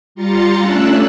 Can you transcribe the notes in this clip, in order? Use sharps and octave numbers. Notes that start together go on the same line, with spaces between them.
G3 F4 A#5 C6 A6 C#7
A3 C#4 D4 E6 F#6